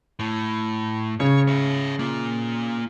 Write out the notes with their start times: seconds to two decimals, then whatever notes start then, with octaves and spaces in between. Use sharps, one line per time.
0.20 A2
1.20 C#3 C#5
1.48 C#5 E5
1.99 A#3 F4